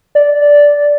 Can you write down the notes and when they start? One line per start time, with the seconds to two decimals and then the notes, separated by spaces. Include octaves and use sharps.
0.15 D5